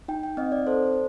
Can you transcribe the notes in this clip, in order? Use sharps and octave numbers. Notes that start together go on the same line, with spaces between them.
D#4 G5
G5
C4 D#5
D5
A4 C5